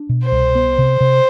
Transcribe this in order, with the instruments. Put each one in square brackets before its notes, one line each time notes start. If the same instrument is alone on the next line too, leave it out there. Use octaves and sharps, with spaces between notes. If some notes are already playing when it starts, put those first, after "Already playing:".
Already playing: [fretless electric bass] D4
B2
[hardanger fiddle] C5
[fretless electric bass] C2
B3
C3
C3